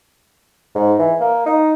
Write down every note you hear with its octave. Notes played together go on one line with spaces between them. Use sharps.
G#2
E3
A#3
D#4